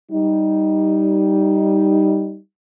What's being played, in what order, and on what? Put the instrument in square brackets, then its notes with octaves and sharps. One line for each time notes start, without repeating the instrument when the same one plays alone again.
[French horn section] G3 D#4